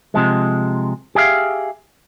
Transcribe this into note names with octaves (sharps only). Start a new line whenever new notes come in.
C3 F3 G#3
G4 G#4 E5 F5